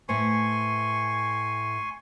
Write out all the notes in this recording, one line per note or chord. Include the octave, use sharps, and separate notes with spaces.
A2 B4 C5 G#5 C6 C#6